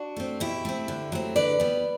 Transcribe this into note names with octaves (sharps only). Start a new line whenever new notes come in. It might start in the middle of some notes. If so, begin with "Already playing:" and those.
Already playing: D4 F#4
A3 C4
B2 E4 G4
A3 C4
D3
F#3 A3 C4
D3 B4 D5
G3 B3